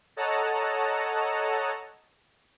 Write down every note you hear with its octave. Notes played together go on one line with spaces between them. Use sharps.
A4 C#5 D#5 F#5 A5 A#5